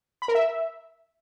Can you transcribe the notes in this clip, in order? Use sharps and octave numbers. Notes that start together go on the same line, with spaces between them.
B5
A#4
E5